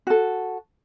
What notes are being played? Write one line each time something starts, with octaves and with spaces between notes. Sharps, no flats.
F#4 A4